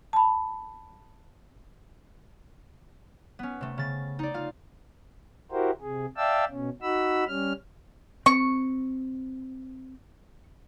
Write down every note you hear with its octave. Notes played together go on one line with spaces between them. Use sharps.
A5 B5
B3 C#4
C3 A3
C#3 A6
D#4 D5
F4 F5
E4 F#4 G4 A#4 C5
C3 G#4
D5 E5 F5 G5 A5 E6
B2 C#4
D#4 F#4 B5 E6
G3 C#4 F6
C4 C#6